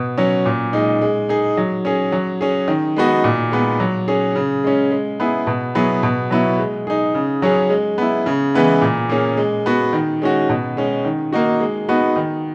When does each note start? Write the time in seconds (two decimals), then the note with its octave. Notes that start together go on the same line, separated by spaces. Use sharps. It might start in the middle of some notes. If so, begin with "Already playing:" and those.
Already playing: B2
0.18 F#3 C#4
0.46 A#2
0.73 G#3 D#4
1.02 G#3
1.29 D#4 G#4
1.57 F#3
1.85 C#4 G#4
2.12 F#3
2.41 C#4 G#4
2.68 D#3
2.97 G#3 B3 D#4 F#4
3.24 A#2
3.52 G#3 B3
3.80 F#3
4.08 C#4 G#4
4.36 C#3
4.64 G#3 C#4
4.92 G#3
5.20 B3 E4 G#4
5.47 B2
5.75 F#3 B3 E4 G#4
6.03 B2
6.31 F#3 B3 E4
6.59 G#3
6.87 D#4 G#4
7.15 C#3
7.42 F#3 C#4 G#4
7.70 G#3
7.98 B3 E4
8.26 C#3
8.54 E3 G#3 B3 E4
8.82 A#2
9.09 A#3 C#4 G#4
9.37 G#3
9.66 B3 F#4
9.93 D#3
10.22 G#3 C#4 F#4
10.49 B2
10.77 G#3 C#4
11.05 D#3
11.32 A#3 D#4 F#4
11.60 G#3
11.88 B3 D#4 F#4
12.16 D#3